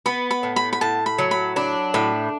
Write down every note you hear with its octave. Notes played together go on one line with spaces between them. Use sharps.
B3 B5
B5
A2
B5
B5
A2 A5
B5
F#3
B5
D4 B5
A2 B5